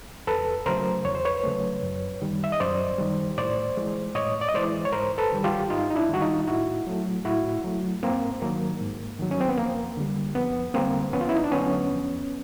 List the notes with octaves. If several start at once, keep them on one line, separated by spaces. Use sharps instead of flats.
E2 A4 B4
C#3 F#3 A3 A#4 C5
E2 C#5
C5
B4 C#5
C#3 F#3 A3
F#2
D#3 G3
E5
D#5
F#2 C5 D5
D#3 G3
A2 C5 D5
E3 G#3
A2 C#5 D#5
D5
D#5
E3 G#3 C5 D5
C#5
G#2 A#4 C5
A4 B4
D#3 G3
F4 G4
G#2 D#4 F4
D#4
D4 E4
D#3 G3 F#4
D#4 F4
A2 E4 F#4
F#3 A3
A2 E4 F#4
F#3 A3
G#2 A#3 C4
D#3 F#3 A#3
G#2
D#3 F#3
C#4
C4
B3
F2 A#3
D3 G3
F2 B3
D3 G3 A#3 C4
F2 B3 C#4
F4
E4
D#4
D4
D3 F#3 A3 B3 C#4
F2